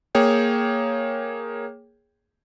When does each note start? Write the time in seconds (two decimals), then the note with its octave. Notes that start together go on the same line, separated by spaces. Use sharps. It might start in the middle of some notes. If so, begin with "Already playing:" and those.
0.15 A#3 G#4 C#5 G5